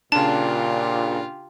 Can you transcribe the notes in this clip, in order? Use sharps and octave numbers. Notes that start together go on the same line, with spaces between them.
A#2 C#3 D4 F4 G4 A5